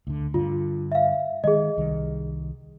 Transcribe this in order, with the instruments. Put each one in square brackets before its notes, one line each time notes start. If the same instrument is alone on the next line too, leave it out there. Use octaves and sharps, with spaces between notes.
[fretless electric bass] D2 D3
[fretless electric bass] G2 D3 [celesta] F4
[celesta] E5 F5
[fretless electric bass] D#3 G#3 [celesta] G#4 D#5
[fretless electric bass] C2 D#3 G3